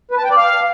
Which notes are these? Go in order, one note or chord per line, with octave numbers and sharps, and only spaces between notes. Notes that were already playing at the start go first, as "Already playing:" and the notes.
B4
A5
G5
D5
F5